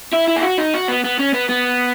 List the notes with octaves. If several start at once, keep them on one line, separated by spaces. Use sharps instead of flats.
E4
E4
G#4
F#4
D#4
F#4
B3
B3
C#4
B3
B3